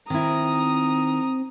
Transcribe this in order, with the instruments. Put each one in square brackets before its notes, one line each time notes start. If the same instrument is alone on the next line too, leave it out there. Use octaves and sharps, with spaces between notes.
[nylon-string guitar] D#3 E4 [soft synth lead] C4 [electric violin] A#5 D#6